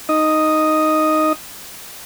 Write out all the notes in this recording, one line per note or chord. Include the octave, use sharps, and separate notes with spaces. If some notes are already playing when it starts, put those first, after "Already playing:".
D#4 D#5 D#6